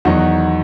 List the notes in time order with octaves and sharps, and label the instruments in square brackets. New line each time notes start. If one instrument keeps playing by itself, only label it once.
[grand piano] E2 D#3 F#3 D#4 F#4